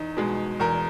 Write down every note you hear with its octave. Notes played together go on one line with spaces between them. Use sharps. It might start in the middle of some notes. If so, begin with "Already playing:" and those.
Already playing: E2 D#4
B2 G#3
E2 A#4